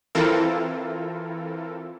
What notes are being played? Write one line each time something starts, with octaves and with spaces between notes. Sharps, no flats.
E3 C4 E4 F4 A4 A#4